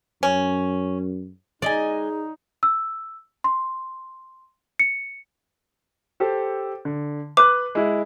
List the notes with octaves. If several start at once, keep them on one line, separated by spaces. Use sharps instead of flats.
F#2 C#4
G#3 D#4 G#4 D5 D#5 G#5
E6
C6
C#7
G4 A4 C5
D3
B4 D6 F#6
G#3 E4